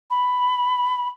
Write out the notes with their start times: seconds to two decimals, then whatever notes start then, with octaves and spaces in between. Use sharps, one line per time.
0.10 B5